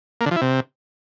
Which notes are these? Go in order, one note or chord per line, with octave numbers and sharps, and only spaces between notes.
A#3
D3
F3
E4
C3